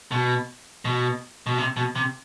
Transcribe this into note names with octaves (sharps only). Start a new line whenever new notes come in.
B2
B2
B2
C3
B2
C3